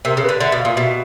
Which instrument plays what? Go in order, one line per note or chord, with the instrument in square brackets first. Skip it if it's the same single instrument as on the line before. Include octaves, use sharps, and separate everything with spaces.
[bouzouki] C3 [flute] A#4
[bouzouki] C#3 [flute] A#4
[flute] B4
[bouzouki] D3
[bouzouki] D3 [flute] E5
[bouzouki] B2
[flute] F5
[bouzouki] A#2
[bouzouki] B2 [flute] E5